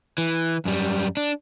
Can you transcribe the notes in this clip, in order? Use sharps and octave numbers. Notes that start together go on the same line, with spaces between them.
E3
F#2 G3
D4